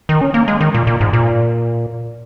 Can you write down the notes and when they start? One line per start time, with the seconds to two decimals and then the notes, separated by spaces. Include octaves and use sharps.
0.09 D#3
0.21 C#4
0.34 A#3
0.48 G#3
0.61 D#3
0.74 A#2
0.87 A#2
1.01 G#2
1.13 A#2